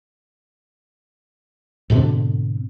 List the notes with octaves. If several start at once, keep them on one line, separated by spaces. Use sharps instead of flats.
G#2 B2 D3 C4